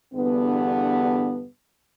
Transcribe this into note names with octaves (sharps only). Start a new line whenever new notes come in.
E2 G2 D3 B3